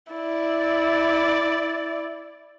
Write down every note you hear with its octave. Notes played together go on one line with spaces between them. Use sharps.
E4 D5